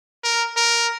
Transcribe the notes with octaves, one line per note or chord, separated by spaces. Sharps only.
A#4
A#4